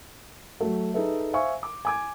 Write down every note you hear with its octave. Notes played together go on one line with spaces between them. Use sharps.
F#3 A3 F#4
D#4 G#4 A4 B4 E5
C5 E5 F5 G#5 C#6
D6
G#5 D6 G#6